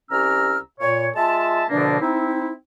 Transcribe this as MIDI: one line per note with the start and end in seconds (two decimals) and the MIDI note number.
0.11 0.58 36
0.11 0.58 61
0.11 0.58 67
0.11 0.58 82
0.11 0.58 88
0.11 0.58 89
0.80 1.09 46
0.80 1.09 73
1.15 1.64 56
1.15 1.64 65
1.15 1.64 76
1.15 1.64 81
1.70 1.99 40
1.70 1.99 47
1.70 1.99 50
1.70 1.99 53
1.70 1.99 58
1.70 1.99 62
2.01 2.51 60
2.01 2.51 63
2.01 2.51 64